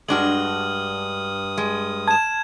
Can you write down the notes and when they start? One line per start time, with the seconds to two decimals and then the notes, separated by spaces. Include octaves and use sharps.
0.08 G2 G#3 D4 F#4 D#6 F6 F#7
1.57 G#3
2.08 A5 G#6 E7